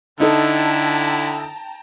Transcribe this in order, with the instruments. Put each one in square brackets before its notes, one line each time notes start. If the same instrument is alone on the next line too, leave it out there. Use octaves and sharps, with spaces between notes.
[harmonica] D3 E4 [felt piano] D#4 A4 [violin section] G5 A5 A#5